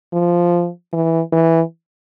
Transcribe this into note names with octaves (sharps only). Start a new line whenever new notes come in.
F3
E3
E3